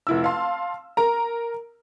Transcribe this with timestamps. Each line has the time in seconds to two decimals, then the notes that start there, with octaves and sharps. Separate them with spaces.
0.07 F1 E4 E6
0.24 F5 A5 C6
0.97 A#4 A#5